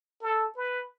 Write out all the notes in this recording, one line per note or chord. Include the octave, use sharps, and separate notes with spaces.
A4
B4